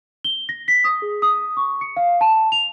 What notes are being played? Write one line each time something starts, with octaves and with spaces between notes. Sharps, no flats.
G7
A#6
B6
D#6
G#4
D#6
C#6
C#7
F5
A5
F7